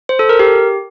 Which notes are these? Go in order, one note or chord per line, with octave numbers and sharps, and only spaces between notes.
C5
A4
A#4
G4